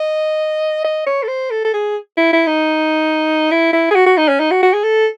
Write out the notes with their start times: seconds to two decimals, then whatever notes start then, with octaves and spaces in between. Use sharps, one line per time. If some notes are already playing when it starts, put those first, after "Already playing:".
Already playing: D#5
0.84 D#5
1.06 C#5
1.23 A4
1.28 C5
1.50 A4
1.64 A4
1.73 G#4
2.17 E4
2.33 E4
2.47 D#4
3.51 E4
3.73 E4
3.91 G#4
3.95 F#4
4.06 F#4
4.17 D#4
4.28 C#4
4.40 D#4
4.51 F#4
4.62 F#4
4.73 G#4
4.83 A4